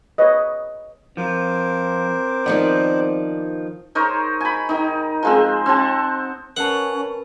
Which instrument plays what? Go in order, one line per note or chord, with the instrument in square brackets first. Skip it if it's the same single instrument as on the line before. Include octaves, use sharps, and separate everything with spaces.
[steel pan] B4 C#5 D#5
[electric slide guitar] F3 [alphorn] C4 [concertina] A#4 C5 D6
[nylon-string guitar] D#3 F3 B3 [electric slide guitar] D5
[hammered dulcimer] D#4 A#4 C5 C#5
G#5 B5
D#3 D#4
F3 G#3 C4
C4 F#5 A5
[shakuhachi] C#4 [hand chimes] A#4 B4 A5 [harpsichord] F#5